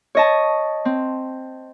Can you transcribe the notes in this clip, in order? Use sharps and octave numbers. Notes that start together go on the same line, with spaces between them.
C#5 D#5 A5
C4